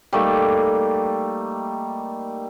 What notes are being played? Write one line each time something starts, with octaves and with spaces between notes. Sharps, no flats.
G3 A3 A#3 D#4